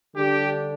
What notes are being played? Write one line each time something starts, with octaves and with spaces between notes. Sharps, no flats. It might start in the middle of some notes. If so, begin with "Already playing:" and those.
D3 G3 D4 G4